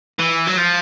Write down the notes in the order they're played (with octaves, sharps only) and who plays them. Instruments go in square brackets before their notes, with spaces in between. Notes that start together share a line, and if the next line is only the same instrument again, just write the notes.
[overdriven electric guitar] E3
F#3
F3